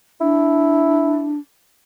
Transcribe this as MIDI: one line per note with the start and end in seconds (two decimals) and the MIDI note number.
0.21 1.39 62
0.21 1.32 64